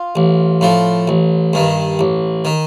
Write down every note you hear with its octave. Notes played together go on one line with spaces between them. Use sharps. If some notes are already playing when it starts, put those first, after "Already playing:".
Already playing: F4
A1
A2 F3
A1
G2 D#3
A1
D#3